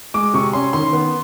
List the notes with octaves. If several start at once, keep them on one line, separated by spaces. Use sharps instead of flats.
G#3 D6
C3 C#6
C#4 C6
D#3 C6
B3